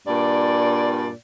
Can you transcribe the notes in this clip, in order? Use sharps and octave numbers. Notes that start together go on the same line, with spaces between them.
G2 A#2 D5